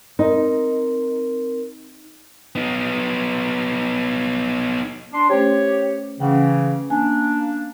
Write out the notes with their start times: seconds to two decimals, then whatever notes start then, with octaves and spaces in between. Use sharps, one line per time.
0.19 C4 D#4 A#4
2.56 B3 D#4
5.13 D4 C6
5.30 A3 C#4 G4 C5 C#5
6.20 C#3 E3 C#4 F#5 G5
6.90 A#3 D4 G#5